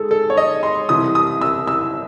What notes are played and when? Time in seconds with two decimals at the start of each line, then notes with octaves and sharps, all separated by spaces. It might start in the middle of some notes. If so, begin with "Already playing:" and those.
Already playing: G#2 G#3 G#4 A4
0.11 A4
0.30 C#5
0.37 D#5
0.63 C6
0.89 C2 C3 E3 D#6
1.15 D#6
1.41 E6
1.67 E6